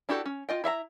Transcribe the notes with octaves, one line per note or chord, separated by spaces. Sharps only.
D4 E4 F#4 G4 A4
C#4
F4 D#5 G5
E4 E5 F5 A#5